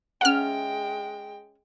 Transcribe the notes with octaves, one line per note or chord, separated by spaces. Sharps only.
G#3 C#4 E5 F#5 G5 A#5 F6